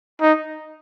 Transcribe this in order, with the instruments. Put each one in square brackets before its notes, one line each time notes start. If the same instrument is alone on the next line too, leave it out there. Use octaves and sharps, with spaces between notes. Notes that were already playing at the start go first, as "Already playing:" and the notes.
[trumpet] D#4